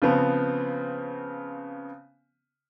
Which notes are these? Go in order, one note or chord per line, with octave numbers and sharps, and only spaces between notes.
C#3 F3 B3 C4